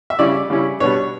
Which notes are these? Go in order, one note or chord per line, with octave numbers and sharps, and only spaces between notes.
E5
C#3 G3 C#4 E4 D5
C#3 G3 C#4 E4
B2 G3 B3 D4 C#5